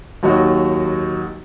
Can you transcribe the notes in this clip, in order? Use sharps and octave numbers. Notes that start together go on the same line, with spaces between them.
D#2 F#3 D#4 F#4